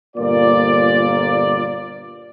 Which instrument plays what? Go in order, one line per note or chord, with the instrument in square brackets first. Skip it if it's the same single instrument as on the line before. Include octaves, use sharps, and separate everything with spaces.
[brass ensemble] G1 A#2 A#3 F4 D5